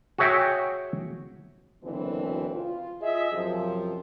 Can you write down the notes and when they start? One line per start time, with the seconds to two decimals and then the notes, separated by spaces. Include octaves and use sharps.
0.18 F#4 G#4 C#5 E5 F#5 G5
1.83 F#1 B2 D3 E3 C4
2.54 F4
3.01 F4 G#4 D#5 E5
3.32 F#2 C3 F3